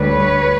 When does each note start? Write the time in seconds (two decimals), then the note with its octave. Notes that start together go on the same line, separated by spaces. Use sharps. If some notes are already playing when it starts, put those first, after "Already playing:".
Already playing: D2 D3 G3 B4 C#5